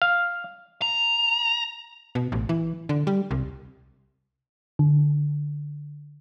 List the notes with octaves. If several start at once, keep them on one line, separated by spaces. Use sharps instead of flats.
F5
A#5
B2
A1
E3
D3
G3
C2
D3